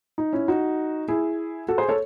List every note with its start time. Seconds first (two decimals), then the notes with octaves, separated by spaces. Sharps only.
0.18 D#4
0.33 C#4 E4
0.48 D#4 F#4
1.08 E4 G#4
1.68 F#4 A4
1.78 G#4 C5
1.89 A4 C#5